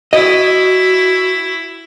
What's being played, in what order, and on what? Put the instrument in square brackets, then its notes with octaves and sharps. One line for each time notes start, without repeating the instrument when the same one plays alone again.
[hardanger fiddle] E4 [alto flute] F#4 [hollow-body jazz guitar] D#5